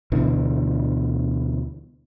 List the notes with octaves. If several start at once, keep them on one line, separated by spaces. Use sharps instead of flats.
D2 B2 D3 E3